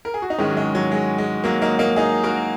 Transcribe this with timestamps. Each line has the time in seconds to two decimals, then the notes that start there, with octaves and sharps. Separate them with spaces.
0.05 A#4
0.14 G#4
0.22 F#4
0.30 D#4
0.38 G#2 D#3 G#3 C#4
0.51 F#3
0.57 G#3
0.75 F#3
0.92 G#3
1.18 G#3
1.44 F#3 A#3
1.62 A#3 D#4
1.79 A#3 D#4
1.96 D#4 G#4
2.23 F#4 A#4